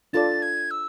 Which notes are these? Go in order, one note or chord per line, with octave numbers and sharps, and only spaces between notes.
D4 F4 A4 D5 A6
G#6
E6